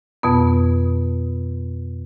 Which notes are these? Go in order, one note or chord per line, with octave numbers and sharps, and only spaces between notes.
F2 B2 B3